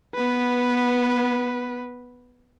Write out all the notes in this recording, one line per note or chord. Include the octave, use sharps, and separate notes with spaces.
B3 B4